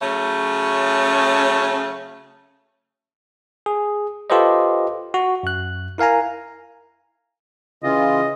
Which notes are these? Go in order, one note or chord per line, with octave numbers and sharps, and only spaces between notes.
C#3 F#3 A3 C#4
G#4
F4 G4 A4 B4 C5 D#5
F#4
F#2 F#6
E4 A#4 F5 G#5 A#5
C#3 E3 F4 D#5